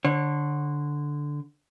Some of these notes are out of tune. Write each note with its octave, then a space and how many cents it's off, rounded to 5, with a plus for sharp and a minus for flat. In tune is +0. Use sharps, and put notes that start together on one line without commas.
D3 +0 C#5 -35